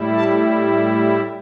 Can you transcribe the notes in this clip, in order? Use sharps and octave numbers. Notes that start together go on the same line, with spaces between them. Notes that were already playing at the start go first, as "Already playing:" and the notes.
Already playing: A2 G3 E4
A5